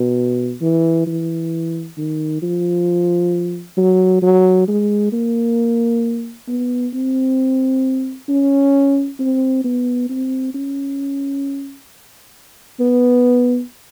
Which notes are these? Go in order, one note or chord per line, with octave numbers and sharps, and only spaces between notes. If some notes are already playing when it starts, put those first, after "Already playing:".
Already playing: B2
E3
E3
D#3
F3
F#3
F#3
G#3
A#3
B3
C4
C#4
C4
B3
C4
C#4
B3